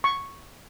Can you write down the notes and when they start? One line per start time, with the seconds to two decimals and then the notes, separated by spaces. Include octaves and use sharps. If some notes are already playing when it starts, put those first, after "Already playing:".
0.04 C#6